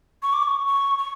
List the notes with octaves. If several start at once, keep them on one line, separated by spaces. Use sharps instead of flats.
C#6
D6
C#6
C#6
C#6